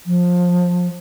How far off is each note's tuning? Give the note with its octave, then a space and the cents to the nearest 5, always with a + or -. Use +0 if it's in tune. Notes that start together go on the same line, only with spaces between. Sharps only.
F3 +20